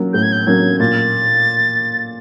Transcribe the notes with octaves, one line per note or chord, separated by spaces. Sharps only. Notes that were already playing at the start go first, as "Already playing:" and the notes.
Already playing: F#3 A#3 C#4
A2 G6
G#6
G6
F#3 A#3 C#4 G#6
A#2 A6